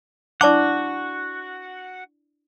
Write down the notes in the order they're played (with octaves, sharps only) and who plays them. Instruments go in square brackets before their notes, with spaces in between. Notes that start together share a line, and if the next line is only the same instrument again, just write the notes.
[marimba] D4 E4 [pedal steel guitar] F#4 F#5 [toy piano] D5 A5 D6